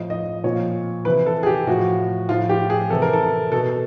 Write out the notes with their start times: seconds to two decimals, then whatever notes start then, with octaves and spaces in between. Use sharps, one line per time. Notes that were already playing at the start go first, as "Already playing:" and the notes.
Already playing: A2 F3 D#5
0.10 D#5
0.44 A#2 F3 C#5
1.05 C3 E3 B4
1.26 A4
1.43 G#4
1.46 G4
1.67 A2 F3 F#4
2.29 A2 F3 F4
2.49 G4
2.70 G#4
2.90 C3 E3 A4
3.02 A#4
3.13 A4
3.52 B2 A4